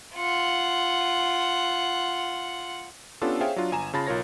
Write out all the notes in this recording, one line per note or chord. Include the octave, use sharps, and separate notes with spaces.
F4 F#5
B3 C#4 D4 F4 G4 A4
G#4 C5 C#5 E5 F5 G5
F#3 D4 F4
G1 G#5 A#5 E7
C#3 F4 A5 B5 A6 A#6
B1 F4 A#4 C#5 A#6